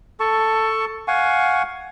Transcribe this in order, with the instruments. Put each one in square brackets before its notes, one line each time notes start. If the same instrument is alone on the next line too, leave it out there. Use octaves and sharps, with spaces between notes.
[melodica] A4 A5 C#6
F5 F#5 G#5 C#6